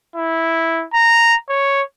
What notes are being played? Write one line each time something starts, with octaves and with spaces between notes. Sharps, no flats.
E4
A#5
C#5